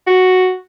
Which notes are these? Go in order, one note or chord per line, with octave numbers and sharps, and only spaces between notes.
F#4